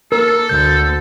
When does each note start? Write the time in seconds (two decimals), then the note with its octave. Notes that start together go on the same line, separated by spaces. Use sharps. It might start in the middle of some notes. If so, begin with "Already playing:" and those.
0.12 A#3 A4 A#4 E6
0.49 D2 G6